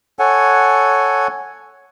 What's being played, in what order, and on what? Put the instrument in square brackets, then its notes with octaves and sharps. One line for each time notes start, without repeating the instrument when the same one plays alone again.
[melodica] A4 C#5 F#5 G#5